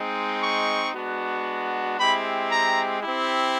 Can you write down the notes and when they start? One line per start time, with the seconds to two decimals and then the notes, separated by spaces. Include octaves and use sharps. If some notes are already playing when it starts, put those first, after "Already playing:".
Already playing: G#3 C4 D#4
0.43 C#6
0.94 G#3 B3 D4 F#4
1.98 G#3 C4 E4 G4 B5
2.50 A#5
3.02 C4 E4 G4